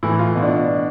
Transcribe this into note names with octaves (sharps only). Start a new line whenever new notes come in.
A2 E3 E4
F4
B2
D4